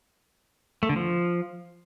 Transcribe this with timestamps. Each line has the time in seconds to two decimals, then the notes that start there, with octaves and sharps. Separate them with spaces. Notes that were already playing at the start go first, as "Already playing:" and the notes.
0.83 A3
0.89 D3
0.96 F3